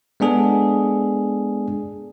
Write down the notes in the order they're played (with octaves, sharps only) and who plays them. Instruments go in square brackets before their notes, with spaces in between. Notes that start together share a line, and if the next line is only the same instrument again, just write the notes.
[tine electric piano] G#3 B3 D4 G#4 A4